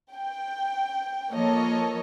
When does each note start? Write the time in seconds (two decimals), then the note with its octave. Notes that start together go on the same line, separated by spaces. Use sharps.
0.12 G5
1.32 F3 A#3 A4 C#5 D#5